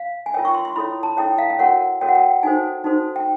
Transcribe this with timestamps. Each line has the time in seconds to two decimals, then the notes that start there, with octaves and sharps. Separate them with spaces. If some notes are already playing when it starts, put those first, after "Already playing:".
Already playing: F5
0.26 G#5
0.34 F4 A#4 C#5 G5
0.45 C#6
0.54 C6
0.65 C6
0.76 E4 A4 C#5 B5
1.03 A5
1.17 E4 A4 C#5 G5
1.38 F5
1.50 G5
1.59 F#4 A#4 C#5 F#5
2.01 F#4 A#4 C#5 G5
2.09 F#5
2.15 G5
2.43 D#4 F#4 A4 C5 G#5
2.84 D#4 F#4 A4 C5
3.16 G5